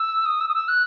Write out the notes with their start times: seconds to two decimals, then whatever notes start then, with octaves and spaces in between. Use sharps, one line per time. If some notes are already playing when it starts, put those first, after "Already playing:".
Already playing: E6
0.26 D#6
0.41 E6
0.49 D#6
0.54 E6
0.68 F#6